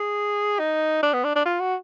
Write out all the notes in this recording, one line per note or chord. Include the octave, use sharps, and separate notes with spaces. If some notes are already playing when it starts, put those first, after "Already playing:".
Already playing: G#4
D#4
D4
B3
D4
D4
F4
F#4